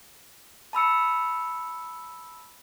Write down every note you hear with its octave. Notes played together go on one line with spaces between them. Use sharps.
A5 B5 E6 C#7